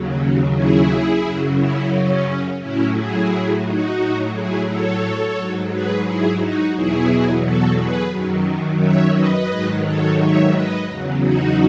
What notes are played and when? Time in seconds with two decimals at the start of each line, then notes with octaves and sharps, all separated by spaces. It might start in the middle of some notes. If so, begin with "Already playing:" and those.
Already playing: D#2 C#3 F#3
0.55 E4 G#4
1.24 F#2 C#3 F#3
1.58 C#4 E4
1.92 C#4
2.61 A2 F#3 C#4 E4
2.96 E4 G#4
3.65 D#4 F#4
3.99 A2 F#3
4.34 E4 G#4
4.67 A4 C#5
5.36 G#2 F#3
5.71 G#4 B4
6.05 E4 G#4
6.40 D#4 F#4
6.75 E2 B2 F#3 E4 G#4
7.43 F#4 A4
7.77 G#4 B4
8.12 F#2 D#3 F#3
8.81 C#5 E5
9.15 B4 D#5
9.49 G#2 D#3 F#3
9.85 A4 C#5
10.19 C#5 E5
10.53 B4 D#5
10.88 E2 C#3 F#3
11.22 D#4 F#4